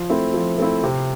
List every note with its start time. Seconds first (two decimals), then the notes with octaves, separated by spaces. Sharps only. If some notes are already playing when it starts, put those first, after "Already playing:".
Already playing: F3
0.10 A3 C4 E4
0.34 F3
0.58 A3 C4 E4
0.83 C3